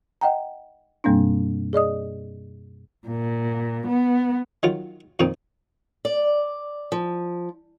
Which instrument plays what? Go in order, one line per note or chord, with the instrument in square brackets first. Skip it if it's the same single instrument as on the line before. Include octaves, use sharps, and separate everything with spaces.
[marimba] D#5 F#5 G5 A#5
F#2 B2 G3 A#3 C4 D4
G#4 D5 D#5 D#6
[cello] A#2
B3
[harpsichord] D#3 F#3 F4
F2 A#2 D#3 C4 D#4
[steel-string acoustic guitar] D5
F3